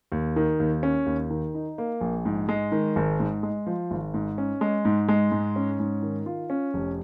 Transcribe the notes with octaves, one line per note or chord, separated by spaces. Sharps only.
D#2
D#3
D#2
C#4
D#2
D#3
D#4
A#3
A#1
G#2
G#3
D#3
G#1
G#2
G#3
F3
G#1
G#2
C#4
G#3
G#2
G#3
G#2
C#4
G#2
D#3
F4
C#4
F1